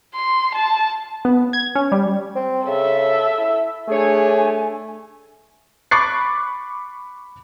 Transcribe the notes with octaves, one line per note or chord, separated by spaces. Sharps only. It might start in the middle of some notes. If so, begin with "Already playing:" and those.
C6
A5
B3
G#6
C#4
G3
C4
C#3 A4 E5
E4
A3 D4 G#4 C#5 G#5
B5 C#6 D6 F#6 A6 C7